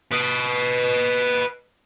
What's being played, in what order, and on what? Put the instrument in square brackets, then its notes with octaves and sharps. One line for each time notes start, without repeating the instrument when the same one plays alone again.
[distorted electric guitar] B4 D#5